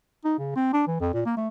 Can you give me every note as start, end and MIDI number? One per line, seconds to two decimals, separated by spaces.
0.24 0.36 63
0.38 0.52 49
0.55 0.71 60
0.73 0.84 62
0.87 0.98 52
1.00 1.11 41
1.13 1.22 46
1.25 1.34 58
1.37 1.48 57